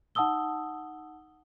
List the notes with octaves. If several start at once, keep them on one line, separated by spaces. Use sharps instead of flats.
D#4 F#5 A5 D#6 E6 G7